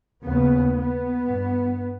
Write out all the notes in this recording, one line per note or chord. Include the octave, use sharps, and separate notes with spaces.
D#2 C#3 B3
B3
G2